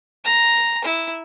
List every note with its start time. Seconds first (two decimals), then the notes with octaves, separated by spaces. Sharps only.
0.25 A#5
0.85 E4